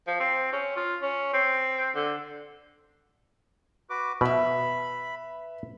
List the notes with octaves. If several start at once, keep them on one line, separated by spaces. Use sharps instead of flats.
F3
C4
C#4
F4
C#4
C4
D3
F#4 B4 D6
B2 B4 E5 B5